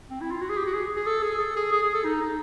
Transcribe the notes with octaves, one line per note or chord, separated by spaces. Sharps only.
C4
E4
F4
F#4
G#4
G4
F#4
G#4
G#4
A4
G#4
A4
G#4
G#4
G#4
A4
D#4
D#4